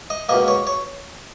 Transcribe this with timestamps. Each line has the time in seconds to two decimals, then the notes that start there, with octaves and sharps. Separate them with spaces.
0.10 D#5
0.29 C#2 B2 A#3 D#5
0.48 C#5
0.67 C#5